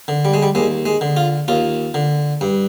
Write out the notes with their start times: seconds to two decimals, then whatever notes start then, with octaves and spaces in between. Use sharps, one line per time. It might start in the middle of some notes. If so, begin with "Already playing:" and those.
0.08 D3
0.25 G3
0.34 G#3
0.42 G3
0.55 D#2 G#3
0.86 G#3
1.01 D3
1.17 F4
1.48 D#2 F4
1.94 D3
2.41 G2